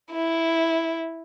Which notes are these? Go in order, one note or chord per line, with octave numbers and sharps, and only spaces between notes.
E4